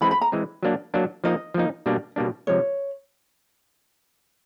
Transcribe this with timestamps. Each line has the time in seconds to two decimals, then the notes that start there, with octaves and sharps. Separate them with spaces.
0.01 E3 G#3 C4 B5
0.11 B5
0.21 A#5
0.32 E3 G#3 C4
0.63 F#3 A#3 D4
0.94 F#3 A#3 D4
1.24 F3 A#3 D#4 D#5
1.54 F3 A#3 D#4
1.86 B2 G3 A#3 D4
2.16 B2 G3 A#3 D4
2.47 C3 F3 G#3 C#5